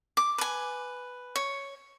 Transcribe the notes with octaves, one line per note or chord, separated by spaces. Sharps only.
D6
B4 G#5
C#5